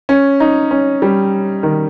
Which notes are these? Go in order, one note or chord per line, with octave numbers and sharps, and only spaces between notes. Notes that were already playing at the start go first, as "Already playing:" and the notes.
C#4
D#4
C#4
G3
D#3